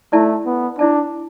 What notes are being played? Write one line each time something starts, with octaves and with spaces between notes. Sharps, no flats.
A3 E4 D5 A5
B3
D4 E4 D5 A5